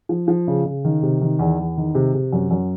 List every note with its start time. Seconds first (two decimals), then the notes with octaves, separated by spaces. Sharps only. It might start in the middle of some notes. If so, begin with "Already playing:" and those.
0.09 F3
0.28 F3
0.47 C#3
0.65 C#3
0.84 D#3
1.03 C3
1.21 D#3
1.39 E2
1.59 E2
1.77 D#3
1.95 C3
2.14 C3
2.32 F#2
2.51 F#2